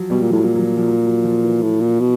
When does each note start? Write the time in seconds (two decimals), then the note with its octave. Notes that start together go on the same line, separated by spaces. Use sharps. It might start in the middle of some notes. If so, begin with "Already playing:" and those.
Already playing: F3 F#3
0.10 B2 G3
0.22 A#2
0.30 F3
0.33 A2 F#3
0.44 A#2
0.55 F#3
0.61 F3
0.77 F3
0.86 F#3
1.05 F#3
1.24 F3
1.43 E3
1.62 A2
1.81 A#2
2.00 B2